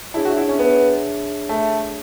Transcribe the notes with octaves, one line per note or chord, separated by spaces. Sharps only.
D4 E4 G#4 C#5 E5 A5
F#4
E4
C#4
B3
A3